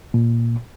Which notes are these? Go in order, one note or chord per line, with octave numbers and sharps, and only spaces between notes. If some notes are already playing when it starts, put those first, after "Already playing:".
A#2